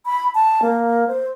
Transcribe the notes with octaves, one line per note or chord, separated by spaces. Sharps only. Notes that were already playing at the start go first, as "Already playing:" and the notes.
B5
A5
A#3
C5